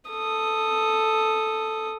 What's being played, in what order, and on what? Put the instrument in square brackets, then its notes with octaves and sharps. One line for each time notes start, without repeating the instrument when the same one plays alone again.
[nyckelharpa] A4 D#6